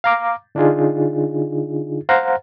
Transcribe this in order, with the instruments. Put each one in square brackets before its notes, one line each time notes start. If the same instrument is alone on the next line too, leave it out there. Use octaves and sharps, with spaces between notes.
[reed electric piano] F5 A#5 D6
D3 D4 D#4 F4 G#4
C5 F5 F#5 A#5